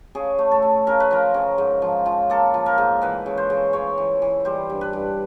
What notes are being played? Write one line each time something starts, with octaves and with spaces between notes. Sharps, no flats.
C#3 G#4
A3
A4
A3
C#3 A#4
B4
F3 A#4
C#3
G#2
F3
F3
A#3 A4
F3
A#4
G#2
E3 B4
C#3
C5
C#3
C#3 C#5
E3
E3
G3 C5
G2
B4
G2